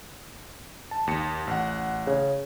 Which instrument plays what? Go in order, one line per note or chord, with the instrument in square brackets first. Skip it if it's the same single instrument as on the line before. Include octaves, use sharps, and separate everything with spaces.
[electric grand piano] A5
D#2 C#7
A1 F#5
[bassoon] C#3